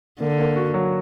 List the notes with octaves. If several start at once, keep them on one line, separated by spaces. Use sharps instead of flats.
D3 A#3
A#3
F#4
F#3